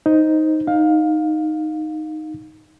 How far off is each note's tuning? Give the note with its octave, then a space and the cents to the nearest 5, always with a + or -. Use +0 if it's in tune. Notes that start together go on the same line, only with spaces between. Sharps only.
D#4 +10 C5 +0
D#4 +0 F5 +20